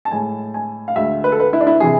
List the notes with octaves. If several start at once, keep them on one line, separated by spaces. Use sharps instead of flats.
A5
A2 G#3 G#5
G#5
F5
D2 D3 G#3 E5
B4
A4
B4
E4
D4
E4
C3 E3 G#4